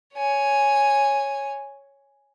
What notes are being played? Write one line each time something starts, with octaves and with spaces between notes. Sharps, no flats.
C#5 G#5